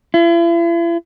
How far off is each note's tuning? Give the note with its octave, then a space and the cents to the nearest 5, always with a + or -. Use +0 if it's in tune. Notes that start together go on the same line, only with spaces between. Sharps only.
E4 +45